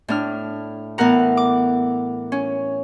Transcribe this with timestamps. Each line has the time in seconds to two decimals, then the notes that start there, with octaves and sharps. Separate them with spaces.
0.08 A2 D4 F6
0.98 A2 E3 B3 A#4 F#5 A#5
1.37 D6
2.32 C#4